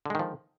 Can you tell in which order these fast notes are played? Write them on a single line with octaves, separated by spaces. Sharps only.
D3 G#3 D#3 F3